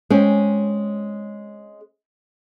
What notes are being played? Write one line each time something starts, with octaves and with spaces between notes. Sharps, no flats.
G#3 C4 C#4